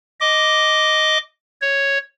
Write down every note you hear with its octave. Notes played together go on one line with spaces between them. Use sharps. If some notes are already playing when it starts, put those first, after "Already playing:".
D#5 D6
C#5